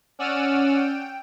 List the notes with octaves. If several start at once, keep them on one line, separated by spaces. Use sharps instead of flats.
C#4 D5 F#5 E6 F6 D#7
G5